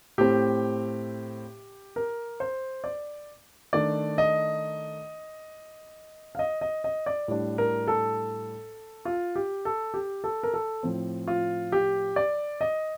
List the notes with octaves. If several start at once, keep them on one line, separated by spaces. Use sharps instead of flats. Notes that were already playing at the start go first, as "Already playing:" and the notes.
A2 A3 C4 G4
A#4
C5
D5
D#3 A3 D4 D5
D#5
F5
D#5
D#5
D#5
D5
A2 G3 D4
A#4
A4
F4
G4
A4
G4
A4
A#4
A4
A2 F3 C4
F4
G4
D5
D#5